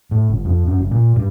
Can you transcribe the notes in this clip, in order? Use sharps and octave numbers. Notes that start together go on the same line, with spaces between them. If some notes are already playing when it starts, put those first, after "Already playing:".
A2
G1
F2
F#2
F#1
A#2
G2